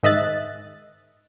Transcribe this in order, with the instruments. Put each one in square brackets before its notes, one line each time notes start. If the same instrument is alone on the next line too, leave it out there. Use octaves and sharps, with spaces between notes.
[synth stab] G#2 D#3 D#5 E5 F#6 A6